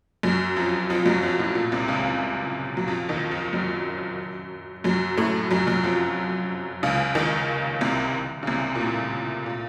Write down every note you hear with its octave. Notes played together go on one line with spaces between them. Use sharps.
F#2 F#3
F2 F3
F2 F3
F#2 F#3
F2 F3
A2
A#2
C2 C3
C#2 C#3
F#3
F2 F3
D#2 D#3
F2 F3
F#2 F#3
F#2 F#3
A2 A3
F#2 F#3
F#2 F#3
F2 F3
C#2 C#3
D#2 D#3
C2 C3
C#3
C2 C3
A#2
A2
A#2